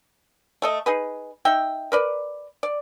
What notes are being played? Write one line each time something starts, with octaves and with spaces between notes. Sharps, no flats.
A3 A4 D#5
D#4 G#4 B4
D#4 E5 G5
A#4 B4 D5
D5